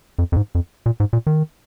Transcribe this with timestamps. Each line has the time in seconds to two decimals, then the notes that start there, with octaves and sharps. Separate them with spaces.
0.19 F2
0.32 F2
0.36 G#2
0.55 F2
0.86 A#2
1.00 G#2
1.13 A#2
1.27 D#3